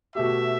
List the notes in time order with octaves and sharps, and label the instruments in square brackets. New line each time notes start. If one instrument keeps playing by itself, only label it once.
[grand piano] B2 A3 G4 [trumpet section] E5